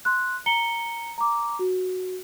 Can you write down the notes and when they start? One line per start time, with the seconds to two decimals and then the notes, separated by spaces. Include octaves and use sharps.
0.05 C6 F#6
0.46 A#5 C#7 G7
1.18 A#5 D6
1.59 F#4